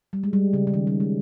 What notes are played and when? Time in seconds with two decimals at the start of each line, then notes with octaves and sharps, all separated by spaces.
0.13 G3
0.23 G#3
0.33 G3
0.53 C#3
0.67 C#3
0.74 D#3
0.87 G3
1.00 G#3